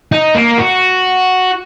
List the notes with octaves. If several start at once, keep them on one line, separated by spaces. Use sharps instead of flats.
D#4
A#3
F#4